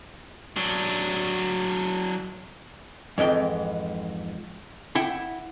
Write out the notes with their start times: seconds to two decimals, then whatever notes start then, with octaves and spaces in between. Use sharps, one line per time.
0.56 F#3 D4
3.18 F2 G#2 E3 G5
4.95 E4 F#5 G5